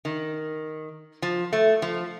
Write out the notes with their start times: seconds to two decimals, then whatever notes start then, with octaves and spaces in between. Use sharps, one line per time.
0.05 D#3
1.22 F3
1.53 A3
1.82 F3